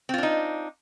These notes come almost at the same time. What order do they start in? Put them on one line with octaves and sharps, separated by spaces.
C4 F4 D4 D#4